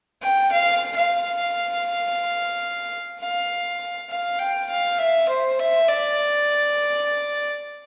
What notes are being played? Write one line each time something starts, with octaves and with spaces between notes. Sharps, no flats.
G5
F5
F5
F5
F5
G5
F5
E5
C5
E5
D5